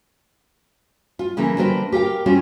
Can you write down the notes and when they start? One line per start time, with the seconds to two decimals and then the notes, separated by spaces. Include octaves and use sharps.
1.19 F4
1.37 C#3 E3 A3 A#3
1.58 D3 G3 A#3 C4 B4
1.92 G4 A#4 F5 G5
2.26 G3 C4 C#4 F4